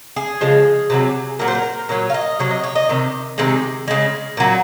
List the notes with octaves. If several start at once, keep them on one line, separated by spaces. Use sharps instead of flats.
G#4
C#3 F3 G#3
C3 D#3 F#3
A#2 F#3 A#4
C5
A#4
A#2 F#3 C#5
F5
D#5
C3 F#3 C#5
D#5
C#5
D#5
C3 D#3
C3 D#3 G#3
C#3 G#3
A#2 F#3